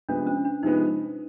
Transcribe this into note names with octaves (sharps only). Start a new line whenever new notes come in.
C3 F3 G#3 B3 D4
C#4
D4
C3 F3 G#3 B3 D#4